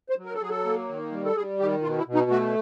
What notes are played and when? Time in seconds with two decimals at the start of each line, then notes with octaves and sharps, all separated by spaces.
0.09 C5
0.18 F#3
0.25 A#4
0.34 A4
0.41 F#3 G#4
0.50 A4
0.65 A#3
0.89 D#3
1.12 G3
1.25 A4
1.36 G3 G#4
1.60 D#3 G4
1.83 B2 F4
1.98 E4
2.06 B2
2.15 D#4
2.30 A3 F#4